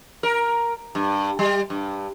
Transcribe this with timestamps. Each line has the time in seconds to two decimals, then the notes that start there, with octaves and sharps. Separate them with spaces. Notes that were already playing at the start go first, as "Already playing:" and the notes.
0.23 A#4
0.95 G2
1.39 G3
1.70 G2